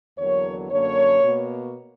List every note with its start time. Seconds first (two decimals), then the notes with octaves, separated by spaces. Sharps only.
0.18 E2 D3 F#3 A#3 C#5
0.71 F#2 D3 A#3 C#5
1.24 B2 A#3